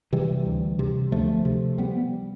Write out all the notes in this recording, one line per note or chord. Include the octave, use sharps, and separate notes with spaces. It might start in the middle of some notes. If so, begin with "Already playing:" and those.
C3 E3 G3
D2
C3
D2 F3 A3
C3
G3 B3